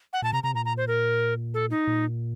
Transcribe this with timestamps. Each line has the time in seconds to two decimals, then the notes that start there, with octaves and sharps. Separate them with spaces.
0.13 F#5
0.22 A#2 A5
0.33 C3 A#5
0.43 C3 A#5
0.54 A#2 A#5
0.65 A#5
0.77 C5
0.88 A#4
1.54 A4
1.70 D#4
1.87 A#2